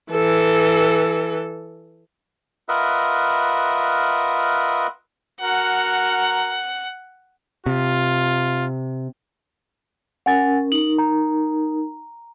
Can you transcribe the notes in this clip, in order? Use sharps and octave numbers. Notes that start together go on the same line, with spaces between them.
E3 A4
F4 A#4 B4 D#5 E5 F#5
F#4 A#4 F#5
C3 F4
C#4 A#4 F#5 G#5 A6
D#4 A#4 F#7
A#5